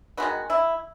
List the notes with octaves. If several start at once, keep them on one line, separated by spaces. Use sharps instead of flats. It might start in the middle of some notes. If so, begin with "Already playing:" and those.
D#3 G#3 B3 F#4
E4